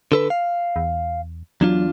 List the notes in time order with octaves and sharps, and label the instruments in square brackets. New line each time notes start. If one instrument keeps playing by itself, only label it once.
[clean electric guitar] D3 A4 B4
F5
[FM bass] E2
[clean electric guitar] E2 D4 F4 [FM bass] F#3